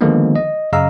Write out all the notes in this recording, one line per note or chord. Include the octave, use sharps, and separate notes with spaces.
D3 D#3 F3 G#3 A#3 B3
D#5
F#2 C#3 D#5 F5 A#5 E6